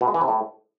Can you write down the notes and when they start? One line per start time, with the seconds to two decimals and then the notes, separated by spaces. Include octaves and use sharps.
0.01 B2
0.08 G#3
0.14 E3
0.21 C3
0.28 A2